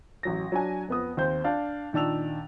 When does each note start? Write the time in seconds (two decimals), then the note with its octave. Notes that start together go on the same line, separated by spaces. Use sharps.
0.23 A1 F#3 A#6
0.52 F#3 D4 G#5
0.88 F2 B3 D#6
1.17 D#2 C4 C5 G6
1.44 D4 F5 G6
1.93 A#2 D#3 D4 E6 F7